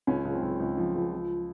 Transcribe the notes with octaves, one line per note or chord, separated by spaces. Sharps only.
C#2 C#4
C#2
C4
C#2
C#2
F3
C#2
F3